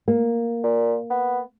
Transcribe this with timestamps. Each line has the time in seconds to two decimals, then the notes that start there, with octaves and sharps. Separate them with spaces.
0.08 A#3
0.64 A#2
1.10 B3